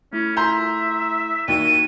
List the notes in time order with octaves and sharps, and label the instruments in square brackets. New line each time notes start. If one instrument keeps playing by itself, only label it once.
[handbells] A3 E4 [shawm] C#4
[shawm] E5 [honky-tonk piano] A#5 C6 G6
[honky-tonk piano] D#2 [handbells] D#4 F#4 D5 [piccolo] D#7